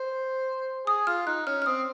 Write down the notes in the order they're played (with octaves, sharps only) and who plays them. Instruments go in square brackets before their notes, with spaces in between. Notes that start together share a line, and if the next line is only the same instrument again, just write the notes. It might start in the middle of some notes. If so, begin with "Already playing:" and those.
Already playing: [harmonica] C5
[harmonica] G#4 [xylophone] D#6
[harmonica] F4 [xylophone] F6
[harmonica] D#4 [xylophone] F#6
[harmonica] C#4 [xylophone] F6
[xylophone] F6
[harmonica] C4 [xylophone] D#6